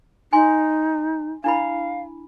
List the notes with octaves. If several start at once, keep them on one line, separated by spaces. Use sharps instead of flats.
D#4 G#5 C6
D4 E4 F5 B5